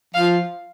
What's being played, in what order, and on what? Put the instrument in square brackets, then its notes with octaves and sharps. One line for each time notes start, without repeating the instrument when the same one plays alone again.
[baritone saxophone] F3 [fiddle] F5